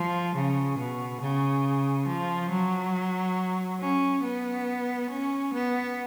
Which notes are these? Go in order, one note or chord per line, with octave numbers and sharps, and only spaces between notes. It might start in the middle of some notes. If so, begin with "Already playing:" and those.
Already playing: F3
C#3
B2
C#3
F3
F#3
C#4
B3
C#4
B3